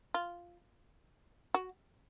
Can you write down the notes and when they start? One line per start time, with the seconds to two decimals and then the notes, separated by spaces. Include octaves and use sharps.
0.14 F4
1.54 F#4